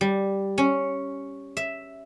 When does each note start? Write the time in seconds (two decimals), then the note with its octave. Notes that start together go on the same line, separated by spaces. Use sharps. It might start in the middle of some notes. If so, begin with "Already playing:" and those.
0.01 G3
0.58 C#4
1.57 E5